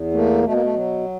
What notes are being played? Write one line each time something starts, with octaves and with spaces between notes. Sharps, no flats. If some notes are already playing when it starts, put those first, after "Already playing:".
Already playing: E2
A3 A#3
B2 A3
A#3
A3
F#3